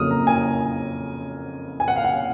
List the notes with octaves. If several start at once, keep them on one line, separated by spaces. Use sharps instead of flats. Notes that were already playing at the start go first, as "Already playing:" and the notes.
Already playing: F2 C#3 F#3 A#3 D#6 F6
A#5
G#5
G#5
F#5
F5
F#5